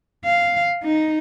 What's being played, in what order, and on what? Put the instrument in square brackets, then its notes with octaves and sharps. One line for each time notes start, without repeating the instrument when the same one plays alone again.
[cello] F5
D#4